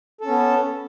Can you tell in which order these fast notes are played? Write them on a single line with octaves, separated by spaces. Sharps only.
A4 C#4 B3